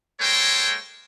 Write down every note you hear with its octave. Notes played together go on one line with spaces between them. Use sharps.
G#3 A#3 A4 C5 C#5 G5